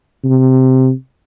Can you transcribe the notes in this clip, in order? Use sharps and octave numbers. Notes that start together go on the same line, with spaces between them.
C3